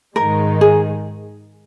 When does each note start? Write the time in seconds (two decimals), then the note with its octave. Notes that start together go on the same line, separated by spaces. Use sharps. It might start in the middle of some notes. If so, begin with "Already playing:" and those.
0.16 G#2 D#3 G#3 D#4 A#4
0.61 G#4